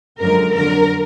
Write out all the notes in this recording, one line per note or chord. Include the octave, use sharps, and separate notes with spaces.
F#2 D3 F3 G#3 A#4
F2 D3 F#3 A#4